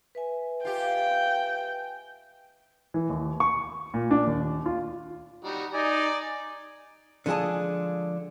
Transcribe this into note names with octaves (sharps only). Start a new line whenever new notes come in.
B4 E5 G#5
F4 G4 G5
E3
D#2
C#6
A#2
D4
D#2
F4
G3 D#4 F#4
D#4 D5 G#5
D3 F3 G#3 G#4 G#5 A5